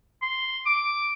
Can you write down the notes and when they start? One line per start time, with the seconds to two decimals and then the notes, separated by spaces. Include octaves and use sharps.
0.22 C6
0.66 D6